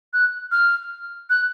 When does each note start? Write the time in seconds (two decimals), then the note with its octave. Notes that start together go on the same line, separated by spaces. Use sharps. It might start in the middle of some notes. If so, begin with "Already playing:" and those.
0.13 F#6
0.52 F6
1.30 F#6